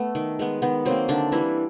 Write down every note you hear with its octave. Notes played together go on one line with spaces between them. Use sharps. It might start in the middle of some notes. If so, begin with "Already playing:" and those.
Already playing: A3 B3
D#3
G#3 B3
D#3 B3
F#3 A#3 C4
D3 D#3 D4
E3 G3 A#3 E4